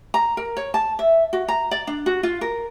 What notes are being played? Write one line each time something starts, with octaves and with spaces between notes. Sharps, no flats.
A#5
A#4
C#5
A5
E5
F#4
A#5
D5
D4
F#4
F4
A#4